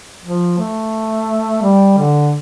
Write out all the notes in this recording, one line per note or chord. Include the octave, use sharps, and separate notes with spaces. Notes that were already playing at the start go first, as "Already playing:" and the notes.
F3
A3
G3
D3